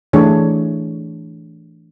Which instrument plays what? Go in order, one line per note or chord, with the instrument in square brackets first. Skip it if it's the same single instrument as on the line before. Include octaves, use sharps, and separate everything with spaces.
[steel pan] E3 A3 D4 G#4 C#5